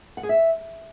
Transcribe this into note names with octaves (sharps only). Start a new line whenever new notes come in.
F#5
G#4
E5